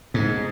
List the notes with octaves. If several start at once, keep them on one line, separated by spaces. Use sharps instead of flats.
G#2